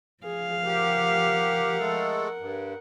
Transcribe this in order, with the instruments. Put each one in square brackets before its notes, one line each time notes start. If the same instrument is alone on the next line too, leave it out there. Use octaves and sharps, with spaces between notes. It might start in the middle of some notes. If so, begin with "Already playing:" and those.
[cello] F3 F5 [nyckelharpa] G#4
[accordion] G4 [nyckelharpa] A#4 F#5
[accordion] G#3 A3 A4
G2